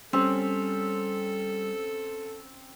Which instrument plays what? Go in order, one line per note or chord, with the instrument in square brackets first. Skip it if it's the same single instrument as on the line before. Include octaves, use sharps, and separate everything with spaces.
[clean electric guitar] G3 [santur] C4 [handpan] C#4 [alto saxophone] A4